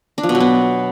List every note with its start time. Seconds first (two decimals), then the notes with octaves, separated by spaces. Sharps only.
0.18 D4
0.23 F3
0.29 B2
0.35 F#3
0.40 B3